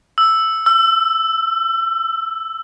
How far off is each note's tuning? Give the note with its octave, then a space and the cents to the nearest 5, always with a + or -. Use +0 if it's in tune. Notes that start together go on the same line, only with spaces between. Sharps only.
E6 +0
E6 +30